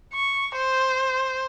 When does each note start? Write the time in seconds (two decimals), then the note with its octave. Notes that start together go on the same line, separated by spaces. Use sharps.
0.13 C#6
0.56 C5